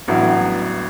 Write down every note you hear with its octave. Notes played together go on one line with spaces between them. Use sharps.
A1 G2 F#3 B3 E4